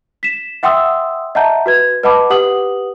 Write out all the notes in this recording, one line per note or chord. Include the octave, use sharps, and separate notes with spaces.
B6 E7
E5 F#5 G5 C6 D#6 E6
D#5 E5 F#5 A5 A#5 G6
F#4 B4 G#6
B4 D#5 F#5 A5 B5 D6
G4 B4 F#5 D#6 F#7